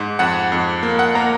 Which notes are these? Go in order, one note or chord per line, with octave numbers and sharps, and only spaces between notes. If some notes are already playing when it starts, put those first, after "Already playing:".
Already playing: G#2
F2 F#5
F2
A#3
F#5
A#3 A#5